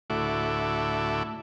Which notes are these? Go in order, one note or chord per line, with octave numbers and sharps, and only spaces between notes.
D2 A2 A3 E4 F#4 D6